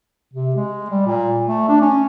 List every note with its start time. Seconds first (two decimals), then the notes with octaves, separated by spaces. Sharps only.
0.34 C3
0.55 G#3
0.89 G3
1.06 A#2
1.46 A3
1.69 D4
1.81 C#4